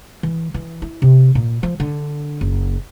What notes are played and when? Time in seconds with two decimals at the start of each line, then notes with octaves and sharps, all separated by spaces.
0.23 E3
0.54 E3
0.82 E4
1.02 C3
1.35 A#2
1.63 F3
1.80 D3
2.41 F#1